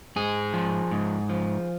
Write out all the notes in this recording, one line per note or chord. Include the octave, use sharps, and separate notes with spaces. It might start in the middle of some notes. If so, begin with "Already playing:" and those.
G#2 G#4
F3
G#2
F3